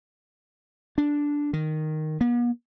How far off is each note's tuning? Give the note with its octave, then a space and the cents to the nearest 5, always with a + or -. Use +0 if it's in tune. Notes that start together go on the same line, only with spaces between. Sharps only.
D4 -5
D#3 -5
B3 -45